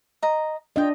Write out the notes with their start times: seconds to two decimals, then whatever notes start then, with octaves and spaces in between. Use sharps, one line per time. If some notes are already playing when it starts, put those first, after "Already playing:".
0.23 D#5 A#5
0.76 D4 F4 D#5 G5